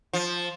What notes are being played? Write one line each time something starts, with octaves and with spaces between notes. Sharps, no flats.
F3